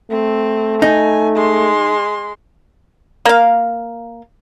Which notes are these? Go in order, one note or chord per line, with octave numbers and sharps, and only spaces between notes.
A3 C4
D#4 G#5
G#3 C6
A#3 F5